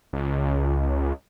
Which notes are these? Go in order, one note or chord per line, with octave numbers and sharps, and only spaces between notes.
C#2